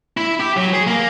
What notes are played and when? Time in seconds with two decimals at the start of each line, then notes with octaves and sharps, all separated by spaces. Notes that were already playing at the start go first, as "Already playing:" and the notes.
0.17 E4
0.40 G4
0.57 F#3
0.73 G#4
0.87 A#3